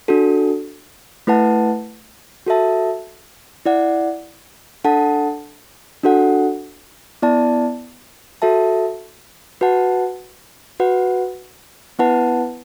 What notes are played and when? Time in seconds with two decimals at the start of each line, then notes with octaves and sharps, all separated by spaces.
0.08 D4 F#4 A4
1.27 A3 E4 B4 F#5 A5
2.47 F#4 A4 E5 A5
3.65 E4 D5 F#5
4.84 D4 A4 F#5 A5
6.03 D4 F#4 A4 F#5
7.22 B3 E4 D5 A5
8.42 F#4 A4 E5 A5
9.61 F#4 B4 F#5 A5
10.80 F#4 B4 F#5
11.99 B3 E4 B4 F#5 A5